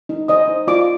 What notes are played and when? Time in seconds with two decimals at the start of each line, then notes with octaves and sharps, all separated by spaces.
0.09 D#4
0.28 C5 D#5 D#6
0.48 D#4
0.67 F4 D5 D6